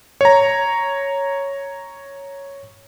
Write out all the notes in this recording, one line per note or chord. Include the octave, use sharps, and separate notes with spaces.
C#5 A#5